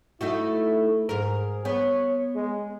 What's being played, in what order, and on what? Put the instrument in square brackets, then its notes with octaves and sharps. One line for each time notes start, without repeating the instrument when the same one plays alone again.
[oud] A3 D#4 F#4 [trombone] E4
[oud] G#2 A#4 [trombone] G#4
[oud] B3 [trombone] C#5
[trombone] G#3